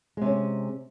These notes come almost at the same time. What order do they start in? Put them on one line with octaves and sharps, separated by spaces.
G#3 C3 C#4